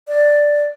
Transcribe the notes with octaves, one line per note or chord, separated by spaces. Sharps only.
D5